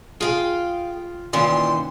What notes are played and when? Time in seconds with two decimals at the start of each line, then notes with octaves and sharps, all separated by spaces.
0.21 F4 G#4 F5 G5
1.33 A#2 D#3 E3 C#4 C6